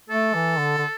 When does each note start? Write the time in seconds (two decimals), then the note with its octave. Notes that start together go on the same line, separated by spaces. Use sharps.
0.09 A3 A4
0.35 E3
0.59 D3
0.78 D3